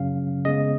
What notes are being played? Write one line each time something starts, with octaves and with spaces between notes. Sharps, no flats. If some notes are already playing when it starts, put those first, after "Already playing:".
Already playing: F#2 C#3 F#3 C#4 F5
C#3 G#3 B3 D#5